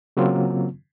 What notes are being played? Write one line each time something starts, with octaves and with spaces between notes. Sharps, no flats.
C#3 F#3 A#3 C4 F4